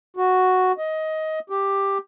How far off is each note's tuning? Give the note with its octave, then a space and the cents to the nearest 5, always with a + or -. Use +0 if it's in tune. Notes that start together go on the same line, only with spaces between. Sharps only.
F#4 +0
D#5 +15
G4 +5